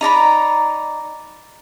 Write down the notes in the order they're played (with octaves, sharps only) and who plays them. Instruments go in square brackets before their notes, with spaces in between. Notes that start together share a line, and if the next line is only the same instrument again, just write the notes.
[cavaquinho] D#4 D5 A#5 B5